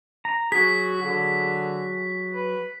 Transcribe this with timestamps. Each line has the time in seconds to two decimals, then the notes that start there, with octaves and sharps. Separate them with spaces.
0.25 A#5
0.52 F#3 F#4 G#4 B6
1.01 D3
2.33 B4